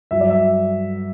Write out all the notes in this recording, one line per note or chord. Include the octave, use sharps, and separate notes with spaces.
G2 F#3 E5
D5
E5